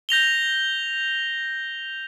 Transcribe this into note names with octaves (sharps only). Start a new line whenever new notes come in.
G6 A#6 F7 G7